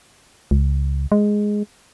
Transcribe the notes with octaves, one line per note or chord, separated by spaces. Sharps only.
C#2
G#3